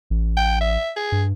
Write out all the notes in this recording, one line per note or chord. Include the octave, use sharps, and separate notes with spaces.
A1
G5
E5
G#4
G2